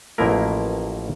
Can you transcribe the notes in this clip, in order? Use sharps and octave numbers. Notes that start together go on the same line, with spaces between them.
A1 B2 F3 A#3 E4 A#4